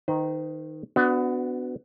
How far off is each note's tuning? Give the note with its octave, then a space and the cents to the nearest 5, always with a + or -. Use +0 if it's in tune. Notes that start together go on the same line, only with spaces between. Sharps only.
D#3 +0 D#4 +0 C5 -45
B3 +25 D4 +0 F#4 -5